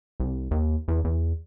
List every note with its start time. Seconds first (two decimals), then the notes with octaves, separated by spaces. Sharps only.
0.20 C2
0.51 D#2
0.88 E2
1.04 E2